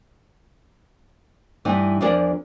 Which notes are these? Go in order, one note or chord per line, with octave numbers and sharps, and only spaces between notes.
G2 E3 D#4
E2 F3 D4 A#4 D5